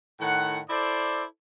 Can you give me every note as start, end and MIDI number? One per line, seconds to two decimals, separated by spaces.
0.21 0.59 45
0.21 0.59 51
0.21 0.59 78
0.70 1.24 64
0.70 1.24 69
0.70 1.24 72
0.70 1.24 74